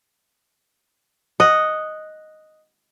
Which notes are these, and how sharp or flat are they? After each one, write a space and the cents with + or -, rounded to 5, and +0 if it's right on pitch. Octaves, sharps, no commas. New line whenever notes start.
D#5 +0 F#5 +0